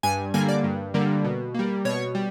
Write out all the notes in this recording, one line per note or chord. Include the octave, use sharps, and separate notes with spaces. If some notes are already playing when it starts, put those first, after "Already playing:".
G2 G#5
D3 G3 A#3 G#5
D5
G2
D3 G3 A#3
B2
G3 A#3
B2 C#5
G3